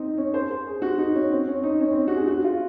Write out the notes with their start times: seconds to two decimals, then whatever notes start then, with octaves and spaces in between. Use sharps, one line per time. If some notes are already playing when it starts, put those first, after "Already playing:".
Already playing: C4 D#4
0.18 C#4
0.34 C5
0.51 C5
0.67 G#4
0.82 F#4
0.98 D#4
1.15 C#4
1.31 C4
1.48 C#4
1.63 D#4
1.80 C#4
1.92 C4
2.08 F#4
2.16 G#4
2.28 F#4
2.44 F4